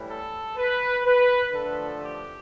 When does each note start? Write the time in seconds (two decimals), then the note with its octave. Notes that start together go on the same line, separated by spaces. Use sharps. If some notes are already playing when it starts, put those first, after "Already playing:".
Already playing: A2 E3 G3
0.09 A4
0.57 B4
1.05 B4
1.54 D3 F3 A3 A4
2.02 G4